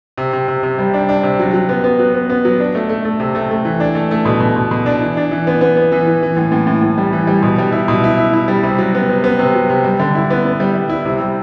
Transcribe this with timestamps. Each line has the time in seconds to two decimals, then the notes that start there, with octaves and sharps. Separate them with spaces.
0.18 C3
0.33 C3
0.48 C3
0.63 C3
0.78 G3
0.94 D4
1.09 D4
1.23 C3
1.39 F#3
1.53 F#3
1.69 B3
1.84 B3
1.99 F#3
2.14 B3
2.30 B3
2.45 F#3
2.60 D4
2.75 A3
2.89 A3
3.05 A3
3.20 C3
3.35 A3
3.51 A3
3.65 E3
3.80 D4
3.95 A3
4.11 A3
4.25 B2
4.40 B2
4.56 B2
4.71 B2
4.86 D4
5.01 E3
5.17 D4
5.31 E3
5.47 B3
5.61 B3
5.77 B3
5.92 E3
6.07 E3
6.23 E3
6.37 A2
6.52 A2
6.67 A2
6.82 A2
6.98 G3
7.13 E3
7.27 G3
7.43 B2
7.58 G3
7.72 E4
7.88 B2
8.04 E4
8.18 E4
8.33 E4
8.48 G3
8.63 C3
8.79 F#3
8.94 B3
9.10 C3
9.24 B3
9.39 C3
9.55 F#3
9.70 C3
9.84 G3
10.00 D3
10.15 E4
10.30 B3
10.44 B3
10.60 G3
10.75 G3
10.89 E4
11.05 C3
11.20 G3